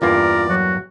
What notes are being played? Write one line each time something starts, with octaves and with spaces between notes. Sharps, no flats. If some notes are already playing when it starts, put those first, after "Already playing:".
E2 G2 A#3 F4 A#4 D5
F#3 F#4